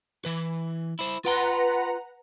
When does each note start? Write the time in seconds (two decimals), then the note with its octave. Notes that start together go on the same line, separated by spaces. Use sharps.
0.25 E3 B4
0.99 E4 C5
1.25 F4 B4 F#5 G5 A#5 C6